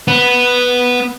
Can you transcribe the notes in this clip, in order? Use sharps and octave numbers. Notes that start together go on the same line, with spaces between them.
B3